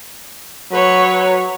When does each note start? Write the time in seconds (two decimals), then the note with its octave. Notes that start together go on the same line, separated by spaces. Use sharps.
0.72 F#3 B4 C#5